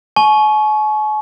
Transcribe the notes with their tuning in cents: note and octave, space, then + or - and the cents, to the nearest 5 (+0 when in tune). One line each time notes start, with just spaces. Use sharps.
G#5 +45 C#6 +0